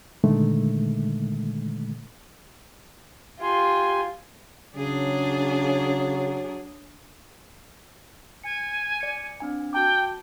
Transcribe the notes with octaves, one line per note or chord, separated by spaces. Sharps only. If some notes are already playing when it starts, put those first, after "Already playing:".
A#2 D3 D#3 G#3 A3
F4 G4 G#5 C6
C#3 F#3 D4 G#4
G#5 C#7
D5 C#7
C4 D4 G#5
F#4 G5 A5 D6